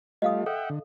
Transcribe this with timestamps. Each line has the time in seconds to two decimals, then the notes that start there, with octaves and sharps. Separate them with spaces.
0.22 G3 A3 F4 D#5 F5 D#6
0.46 A4 E5 F#5 G5
0.70 D3